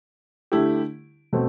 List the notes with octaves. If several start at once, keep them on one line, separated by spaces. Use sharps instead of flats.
D3 A3 E4 G4
B2 A3 C4 F#4